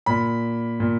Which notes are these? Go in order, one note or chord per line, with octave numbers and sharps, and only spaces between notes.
A#2 B5
A#2